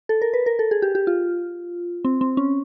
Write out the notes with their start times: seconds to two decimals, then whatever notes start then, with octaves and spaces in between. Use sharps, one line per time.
0.09 A4
0.22 A#4
0.33 B4
0.46 A#4
0.59 A4
0.71 G#4
0.82 G4
0.95 G4
1.07 F4
2.05 C4
2.21 C4
2.37 C#4